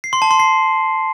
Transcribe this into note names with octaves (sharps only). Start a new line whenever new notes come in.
C7
C6
A5
C6
C7